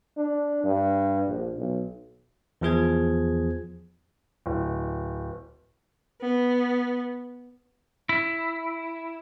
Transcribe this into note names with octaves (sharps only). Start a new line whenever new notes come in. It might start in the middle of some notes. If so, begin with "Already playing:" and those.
D4
G2
A#1
B1
E2 F3 G#4 G#6
D1
B3
E4